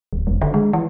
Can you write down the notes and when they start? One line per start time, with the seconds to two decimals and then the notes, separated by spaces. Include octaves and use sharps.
0.13 D1
0.27 F1
0.41 D3
0.54 G#3
0.73 E3